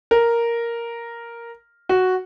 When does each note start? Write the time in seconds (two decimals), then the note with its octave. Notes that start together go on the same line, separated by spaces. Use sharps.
0.11 A#4
1.89 F#4